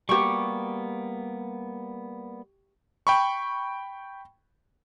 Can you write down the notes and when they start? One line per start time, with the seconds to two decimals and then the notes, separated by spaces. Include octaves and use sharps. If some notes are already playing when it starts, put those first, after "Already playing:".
0.09 G3 A#3 B3 G4 C#6
3.07 G5 B5 C#6